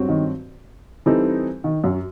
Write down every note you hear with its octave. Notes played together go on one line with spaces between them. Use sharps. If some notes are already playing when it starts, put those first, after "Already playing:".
Already playing: G2 F#3 C4 F#4 C5
D#3
E3 G3 C4 D#4 A4
D#3
F#2 F#3